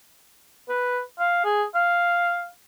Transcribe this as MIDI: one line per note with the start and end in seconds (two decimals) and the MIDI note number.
0.69 1.01 71
1.19 1.41 77
1.44 1.64 68
1.75 2.48 77